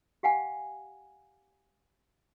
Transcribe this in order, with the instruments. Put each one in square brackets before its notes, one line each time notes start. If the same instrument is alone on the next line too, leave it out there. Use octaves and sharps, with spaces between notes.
[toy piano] G4 F5 F#5 G#5